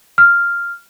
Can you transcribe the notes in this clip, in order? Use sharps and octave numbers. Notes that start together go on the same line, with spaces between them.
F6